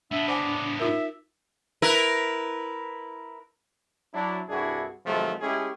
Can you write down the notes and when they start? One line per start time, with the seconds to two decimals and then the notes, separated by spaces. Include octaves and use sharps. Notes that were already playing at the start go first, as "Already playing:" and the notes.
0.11 A2 B3 D4 E5
0.28 C5 D5 F#5 G#5
0.80 D#4 F4 A#4 E5
1.82 E4 A#4 B4
4.14 F#3 D4 E4
4.49 C2 G2 D4 E4 F#4 G#4
5.06 C3 D#3 F3 F#3 G#3 A3
5.42 G#3 A3 C#4 E4 G4 G#4